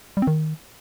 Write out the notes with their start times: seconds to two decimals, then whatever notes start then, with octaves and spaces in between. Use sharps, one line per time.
0.17 G3
0.22 C4
0.27 D#3